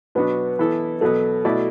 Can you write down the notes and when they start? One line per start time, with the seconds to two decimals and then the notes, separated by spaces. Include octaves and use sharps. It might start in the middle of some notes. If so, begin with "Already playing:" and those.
0.15 B2 F#3 B3 D4 F#4 B4
0.59 E3 B3 E4 A4
1.01 B2 F#3 B3 A4
1.45 B2 A3 E4 F#4 D5